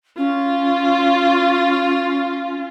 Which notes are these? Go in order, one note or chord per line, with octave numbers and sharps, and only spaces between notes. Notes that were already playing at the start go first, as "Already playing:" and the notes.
C#4 F4